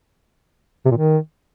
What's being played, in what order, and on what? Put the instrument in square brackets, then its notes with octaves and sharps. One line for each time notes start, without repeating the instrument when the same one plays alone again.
[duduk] C3
A#2
D#3